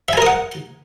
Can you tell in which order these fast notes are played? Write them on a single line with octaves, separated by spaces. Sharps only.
E5 G#5 A#4 D#6 F#5